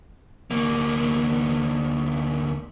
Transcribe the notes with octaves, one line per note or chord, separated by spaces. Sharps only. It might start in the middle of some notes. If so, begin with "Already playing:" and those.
D2 A#3